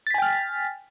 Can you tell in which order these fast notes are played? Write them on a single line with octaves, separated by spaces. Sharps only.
A6 B6 G#5 G5 F6